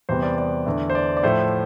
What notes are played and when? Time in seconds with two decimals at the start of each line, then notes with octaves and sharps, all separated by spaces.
0.09 E2 C3 G3 B3 C5
0.23 D5
0.38 D5
0.66 E2 D3 A3
0.90 C5
0.95 D5
1.17 D5
1.23 A2 F3 A3 C5